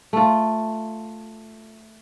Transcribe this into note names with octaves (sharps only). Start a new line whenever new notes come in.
A3 F4